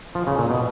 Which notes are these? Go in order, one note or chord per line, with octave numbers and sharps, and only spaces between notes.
F3
C#3
A#2
B2